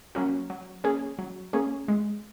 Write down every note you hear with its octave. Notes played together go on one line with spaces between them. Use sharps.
F#3 A#3 C#4 F#4
F#3
A#3 C#4 G#4
F#3
A#3 C#4 G#4
G#3